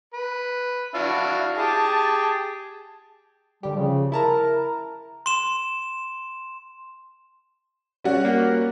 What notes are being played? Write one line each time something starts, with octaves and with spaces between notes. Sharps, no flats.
B4
D4 E4 F#4 F5
G4 G#4 A5
D3 G3 G4
C#3 F3
E4 A#4 A5 A#5
C6 E7
G3 C#4 F#4
A#3